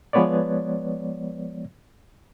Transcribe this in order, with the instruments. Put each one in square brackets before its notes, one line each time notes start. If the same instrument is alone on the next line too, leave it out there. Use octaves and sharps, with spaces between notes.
[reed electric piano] F3 G#3 B3 B4 C#5 D5